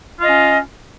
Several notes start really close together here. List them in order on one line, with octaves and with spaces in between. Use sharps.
F4 D#5 C#4